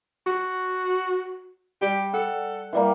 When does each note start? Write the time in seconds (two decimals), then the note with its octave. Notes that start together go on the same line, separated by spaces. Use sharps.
0.27 F#4
1.82 G3 G4
2.14 A4 F#5
2.73 E3 G3 A#3